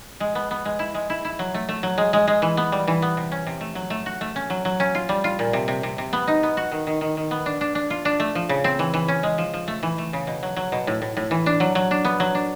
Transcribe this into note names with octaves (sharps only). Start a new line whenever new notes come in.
G#3
B3
B3
G#3
E4
G#3
E4
E4
F#3
A3
A3
F#3
G#3
G#3
G#3
E3
B3
G3
E3
B3
C3
C#4
C3
A3
F#3
A3
F#4
A3
C#4
F#3
F#3
C#4
F4
G3
F4
A#2
C3
C3
C3
C3
B3
D#4
B3
F#4
D#3
D#3
D#3
D#3
B3
D4
D4
D4
F4
D4
A3
F3
C#3
C4
E3
E3
C#4
G#3
F3
F3
A3
E3
A3
C#3
B2
F#3
F#3
B2
A2
A2
A2
E3
D4
F#3
F#3
D4
B3
F#3
D4